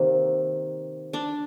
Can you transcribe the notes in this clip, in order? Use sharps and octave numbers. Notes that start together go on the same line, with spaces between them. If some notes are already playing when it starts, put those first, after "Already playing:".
Already playing: C3 D#3 A#3
D4 D5